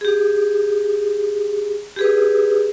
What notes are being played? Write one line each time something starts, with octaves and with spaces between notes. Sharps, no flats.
G4 G#4
G4 G#4 B4